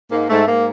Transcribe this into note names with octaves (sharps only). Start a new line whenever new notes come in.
G#2 A#3
G#2 A3
G#2 A#3